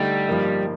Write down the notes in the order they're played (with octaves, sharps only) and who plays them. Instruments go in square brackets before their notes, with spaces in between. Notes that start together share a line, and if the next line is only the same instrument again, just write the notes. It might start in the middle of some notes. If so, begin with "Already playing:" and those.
Already playing: [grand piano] D3 A3 D#4 [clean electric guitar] G3
[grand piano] G2 F3 A#3 D#4